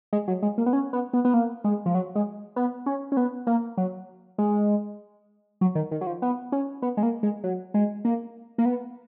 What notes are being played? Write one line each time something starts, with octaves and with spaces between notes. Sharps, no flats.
G#3
F#3
G#3
A#3
B3
C#4
B3
B3
B3
A#3
G#3
F3
F#3
G#3
B3
C#4
C#4
B3
A#3
F#3
G#3
F#3
D#3
D#3
F#3
F3
B3
C#4
B3
G#3
A#3
G#3
F#3
G#3
A#3
A#3
B3